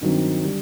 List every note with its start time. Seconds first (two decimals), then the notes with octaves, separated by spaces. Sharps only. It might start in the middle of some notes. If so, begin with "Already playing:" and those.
0.01 G2 D#3 F#3 C4
0.44 D3 G3